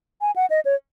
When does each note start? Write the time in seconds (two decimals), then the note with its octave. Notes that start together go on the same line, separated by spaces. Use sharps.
0.21 G#5
0.36 F#5
0.50 D#5
0.65 C#5